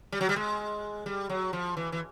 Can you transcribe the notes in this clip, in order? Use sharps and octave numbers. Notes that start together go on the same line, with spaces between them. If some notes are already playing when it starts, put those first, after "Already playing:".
G3
F#3
G3
G#3
G3
F#3
F3
E3
E3